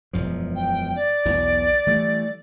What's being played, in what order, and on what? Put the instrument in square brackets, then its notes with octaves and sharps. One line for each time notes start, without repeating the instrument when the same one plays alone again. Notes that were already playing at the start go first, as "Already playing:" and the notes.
[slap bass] E1 F#2 F3
[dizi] G5
D5
[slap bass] B1 E2 B2
E3 G3 A3